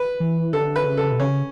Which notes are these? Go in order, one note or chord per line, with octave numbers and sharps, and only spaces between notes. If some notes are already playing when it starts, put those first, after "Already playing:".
Already playing: B4
E3
D3 A4
B4
C#3
A4
B2
C#3 C#4